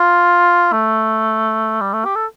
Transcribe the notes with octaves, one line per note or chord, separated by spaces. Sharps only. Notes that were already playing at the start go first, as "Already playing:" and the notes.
Already playing: F4
A3
G3
A3
G4
A4